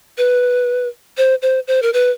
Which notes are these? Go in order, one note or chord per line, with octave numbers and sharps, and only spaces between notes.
B4
C5
C5
C5
A#4
B4